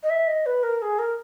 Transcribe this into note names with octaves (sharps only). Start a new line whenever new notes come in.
D#5
E5
D#5
B4
A#4
G#4
A#4